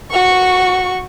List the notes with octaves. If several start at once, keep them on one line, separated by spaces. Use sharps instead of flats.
F#4 C#6